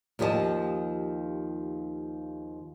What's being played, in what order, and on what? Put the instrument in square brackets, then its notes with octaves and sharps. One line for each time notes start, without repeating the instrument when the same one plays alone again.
[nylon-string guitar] D#2 F3 G4 D5 D#5 A5